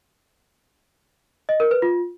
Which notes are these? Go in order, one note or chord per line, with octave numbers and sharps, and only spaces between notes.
D#5
A#4
B4
F4